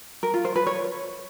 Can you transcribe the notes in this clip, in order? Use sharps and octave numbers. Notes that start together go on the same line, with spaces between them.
A#4
F4
C5
B4
C#5